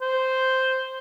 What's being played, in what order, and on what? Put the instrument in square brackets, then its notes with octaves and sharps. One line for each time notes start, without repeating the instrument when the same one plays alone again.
[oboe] C5